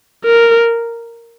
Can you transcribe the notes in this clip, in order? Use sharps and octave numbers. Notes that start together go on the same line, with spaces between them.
A#4